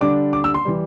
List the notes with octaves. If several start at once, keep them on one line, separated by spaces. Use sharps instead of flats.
D3 G3 D4 D6
D6
E6
C6
E3 G3